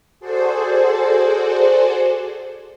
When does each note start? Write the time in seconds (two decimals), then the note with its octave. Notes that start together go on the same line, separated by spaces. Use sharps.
0.20 F#4 G#4 A4 C5 D5